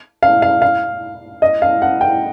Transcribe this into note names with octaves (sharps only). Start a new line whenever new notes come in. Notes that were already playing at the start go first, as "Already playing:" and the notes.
F5
F5
F5
D#5
F5
F#5
G5